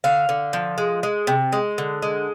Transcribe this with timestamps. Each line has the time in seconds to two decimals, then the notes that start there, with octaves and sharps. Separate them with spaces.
0.04 D3 F5
0.29 D3
0.53 F3
0.78 G#3
1.03 G#3
1.27 C3
1.52 G#3
1.78 D3
2.02 G#3